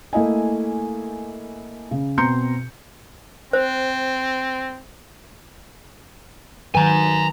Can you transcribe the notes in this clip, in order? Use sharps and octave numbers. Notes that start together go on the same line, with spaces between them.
A3 A#3 E4 D#5 G#5
C#3
B2 C4 A#5 C6 G6 C#7
C4 C5
D#3 F#3 B4 G#5 A#5